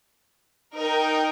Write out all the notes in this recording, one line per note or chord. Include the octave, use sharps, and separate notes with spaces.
D#4 A#4 D#5 G5